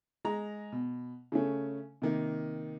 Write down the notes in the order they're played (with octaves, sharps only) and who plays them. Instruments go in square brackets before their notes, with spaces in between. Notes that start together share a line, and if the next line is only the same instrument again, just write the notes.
[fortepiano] G#3 A#5
B2
C#3 A3 C#4
C3 D#3 A#3